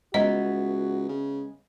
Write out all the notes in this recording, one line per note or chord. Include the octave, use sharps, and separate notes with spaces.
C#2 G#3 B3 F#4 D#5 E5 F#5 A#5
C#3